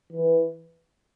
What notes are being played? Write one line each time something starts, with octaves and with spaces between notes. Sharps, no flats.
E3